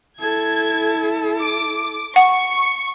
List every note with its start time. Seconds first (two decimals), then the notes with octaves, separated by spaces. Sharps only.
0.20 E4 A4 G#6
1.39 D6
2.16 F#5 C#6